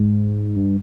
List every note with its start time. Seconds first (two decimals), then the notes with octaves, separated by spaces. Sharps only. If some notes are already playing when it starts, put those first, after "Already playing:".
Already playing: G#2
0.56 G2